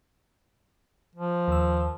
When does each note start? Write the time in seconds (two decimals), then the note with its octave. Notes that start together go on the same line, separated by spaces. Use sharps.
1.15 F3
1.48 D#2 E6